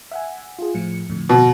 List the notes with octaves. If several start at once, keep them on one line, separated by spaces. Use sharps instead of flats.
E5 F#5 G#5
F4 G#4
A2 F3 C#7
F2 A2 D3
B2